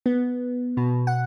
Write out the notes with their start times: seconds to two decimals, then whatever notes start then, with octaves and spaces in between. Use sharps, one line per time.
0.06 B3
0.77 B2
1.07 F#5